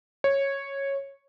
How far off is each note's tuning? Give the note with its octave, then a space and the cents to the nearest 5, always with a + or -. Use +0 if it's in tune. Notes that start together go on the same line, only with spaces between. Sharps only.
C#5 -10